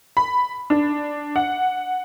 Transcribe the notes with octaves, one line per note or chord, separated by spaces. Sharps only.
B5
D4
F#5